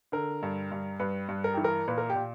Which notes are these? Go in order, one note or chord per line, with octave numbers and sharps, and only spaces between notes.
D3 A#4
G2
G2
G2 B4
G2
A#4
E3 G4
A#4
A#2 B4
A#4
G4
A#2